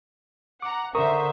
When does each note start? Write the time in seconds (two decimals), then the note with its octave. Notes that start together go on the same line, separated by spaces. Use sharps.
0.62 F#5 A#5 D6
0.95 D3 A#4 C5 E5 A#5 C#6 D#6